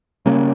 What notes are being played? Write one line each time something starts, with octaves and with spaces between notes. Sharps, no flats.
C#3 G3 A#3 C#4